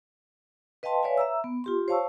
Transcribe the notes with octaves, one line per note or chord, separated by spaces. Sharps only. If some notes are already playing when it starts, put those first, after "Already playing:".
B4 D#5 F5 G5 A5 C6
B4 C#5 D5 E5 F5 G#5
E5 A#5 E6
B3
F4 G4 C6
C5 C#5 F5 A5 C#6 E6